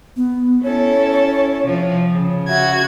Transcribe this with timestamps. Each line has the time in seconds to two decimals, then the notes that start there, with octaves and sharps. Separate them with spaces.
0.16 B3
0.63 C#4 E4 A4 C#5
1.63 C3 F3
2.09 C#3
2.49 F#4 E5 G#6